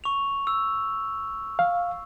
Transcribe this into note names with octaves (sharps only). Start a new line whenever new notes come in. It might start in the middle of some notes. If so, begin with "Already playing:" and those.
C#6 F7
E6
F5